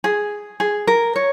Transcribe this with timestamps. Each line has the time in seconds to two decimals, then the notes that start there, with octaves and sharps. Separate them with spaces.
0.04 G#4
0.60 G#4
0.87 A#4
1.16 C#5